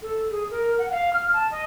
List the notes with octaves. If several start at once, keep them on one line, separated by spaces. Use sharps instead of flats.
A4
G#4
A#4
F#5
F5
F6
A5
D#5